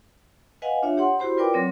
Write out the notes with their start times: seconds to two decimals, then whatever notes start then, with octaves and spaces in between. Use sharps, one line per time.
0.62 B4 D#5 F5 F#5 G#5
0.83 D4 F4 C#5 E5
0.97 G4 C#5 F#5 C6
1.18 E4 F#4 G4 C5 B5 C6
1.37 F4 A#4 B4 D5 G5 D6
1.54 F#3 C4 C#5